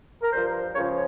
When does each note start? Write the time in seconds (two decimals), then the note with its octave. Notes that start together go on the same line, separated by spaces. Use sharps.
0.22 A#4
0.31 G2 F3 C5
0.74 C#2 C#3 F3 C#5